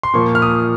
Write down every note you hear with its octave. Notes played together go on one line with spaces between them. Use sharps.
C6
A#2 F3 A#3 C#6
F6
D#6